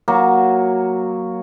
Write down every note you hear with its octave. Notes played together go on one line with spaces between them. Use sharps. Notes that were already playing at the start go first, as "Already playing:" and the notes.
F#3 A#3